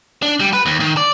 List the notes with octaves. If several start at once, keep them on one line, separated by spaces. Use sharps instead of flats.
D4
G3
B4
D#2
D#3
D5